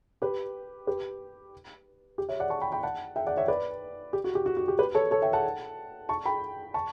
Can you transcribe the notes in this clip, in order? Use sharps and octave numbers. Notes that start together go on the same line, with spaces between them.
G4 B4
G4 B4
G4
C#5 E5
D5 F#5
A5 C#6
G5 B5
G5 B5
F#5 A5
E5 G5
D5 F#5
C#5 E5
B4 D5
G4
F#4
G4
F#4
F#4
G4
G4 B4
A4 C#5
A4 C#5
E5 G5
F#5 A5
A5 C#6
G5 B5
A5 C#6